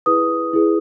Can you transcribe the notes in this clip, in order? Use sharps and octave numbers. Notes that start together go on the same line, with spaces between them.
E4 G#4 B4 D#6
E4 G#4 B4